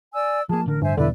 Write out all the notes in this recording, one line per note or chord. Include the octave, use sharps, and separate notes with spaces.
D5 G#5 E6
F3 A#3 G#4 A5
A1 D3 A#4
G2 C5 E5 G#5
E2 G2 B2 D3 E4 B4 D5